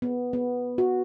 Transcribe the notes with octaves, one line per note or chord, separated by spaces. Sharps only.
B3
B3
F#4